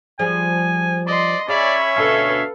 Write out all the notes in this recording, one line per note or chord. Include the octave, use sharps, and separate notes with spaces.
F3 G3 G#4 G#5
D5 D#5 C6
C#4 G#4 C#5 D5 E5 B5
D2 B2 A4 B4 F5